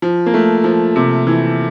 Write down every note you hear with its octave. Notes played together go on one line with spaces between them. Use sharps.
F3
A#3
A3
F3
C3
E3